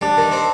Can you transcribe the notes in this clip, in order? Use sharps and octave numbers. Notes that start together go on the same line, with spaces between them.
G3 D4
D#3
C4